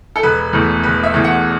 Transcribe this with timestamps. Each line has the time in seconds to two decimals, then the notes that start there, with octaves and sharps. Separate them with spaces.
0.16 A4
0.23 E1 B4
0.53 E2 E3 A3
0.83 E1 B4
1.03 E5
1.14 E2 E3 A3
1.24 F#5